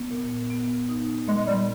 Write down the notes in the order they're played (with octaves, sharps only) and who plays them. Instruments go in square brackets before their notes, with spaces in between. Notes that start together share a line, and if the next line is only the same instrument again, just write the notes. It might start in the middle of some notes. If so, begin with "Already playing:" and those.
Already playing: [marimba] B3
A#2
B3
D#4
[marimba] A#2 [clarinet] G#3
[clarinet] G3